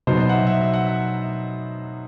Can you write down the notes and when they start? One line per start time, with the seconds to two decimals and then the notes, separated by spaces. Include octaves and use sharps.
0.07 B2 F#3 B3 D#4 C5
0.20 D#5
0.29 F#5
0.33 E5
0.47 E5
0.60 E5
0.74 F#5
0.86 E5